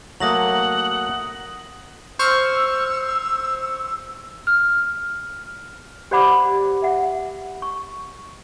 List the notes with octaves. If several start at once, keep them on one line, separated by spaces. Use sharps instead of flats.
F#3 A3 A#3 F#5 D#6 A#6 F#7
C5 C#6 E6 F6
F6
G4 C5 D5 F#5 B5 D6
E5 F#5
C#6